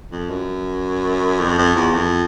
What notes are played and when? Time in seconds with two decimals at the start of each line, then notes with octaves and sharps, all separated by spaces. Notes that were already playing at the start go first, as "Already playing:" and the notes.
0.12 F2
0.30 F#2
1.40 F2
1.58 F2
1.76 E2
1.95 F2